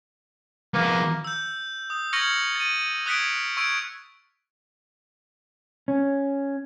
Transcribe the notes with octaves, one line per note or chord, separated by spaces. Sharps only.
F3 A#3 B3
E6 G6
D#6
C#6 F6 G#6 A#6 C#7 F#7
A6 D#7
D#6 F#6 G#6 B6 C#7 D7
C#6 E6 G#6 D7
C#4